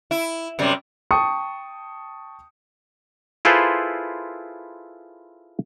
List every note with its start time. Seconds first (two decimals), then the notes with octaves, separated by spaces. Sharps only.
0.11 E4
0.59 F#2 C3 G3
1.11 G5 A5 C#6 D#6 C#7
3.45 E4 F4 G#4 A4 B4 C5